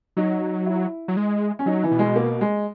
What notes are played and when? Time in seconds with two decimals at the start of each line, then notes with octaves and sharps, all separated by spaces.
0.17 F#3 D#4
0.66 E4
1.08 F#3
1.17 G#3
1.59 C#4
1.66 F#3 D#4
1.83 E3
1.91 B2
1.99 G#3
2.16 A#3
2.41 G#3